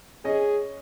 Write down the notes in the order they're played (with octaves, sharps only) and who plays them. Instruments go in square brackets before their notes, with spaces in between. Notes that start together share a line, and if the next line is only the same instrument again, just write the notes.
[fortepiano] C#4 D#5 [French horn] G#4